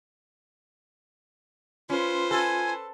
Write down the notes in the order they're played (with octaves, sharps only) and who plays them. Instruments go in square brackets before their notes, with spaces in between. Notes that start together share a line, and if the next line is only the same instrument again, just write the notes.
[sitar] C#4 [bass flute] F4 [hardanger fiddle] B4 C5
[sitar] A4 [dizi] G#5